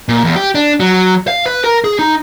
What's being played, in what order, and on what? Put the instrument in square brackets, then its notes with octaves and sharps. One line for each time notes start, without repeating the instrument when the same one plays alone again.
[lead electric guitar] A#2
E2
G4
D4
F#3
F5
B4
A#4
G#4
D#4